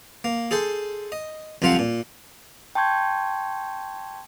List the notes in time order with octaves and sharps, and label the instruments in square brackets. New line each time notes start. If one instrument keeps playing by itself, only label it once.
[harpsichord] A#3
G#4 A4 C5 C6
D#5
C2 F2 F3 C4 F4 F#5
A#2
[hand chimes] G5 A5 C6 C#6 G6 G#6